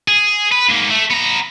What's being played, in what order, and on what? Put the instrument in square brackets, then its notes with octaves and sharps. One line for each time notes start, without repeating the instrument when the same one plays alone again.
[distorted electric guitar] G#4
B4
G#2 A#3
A3
B3 A#5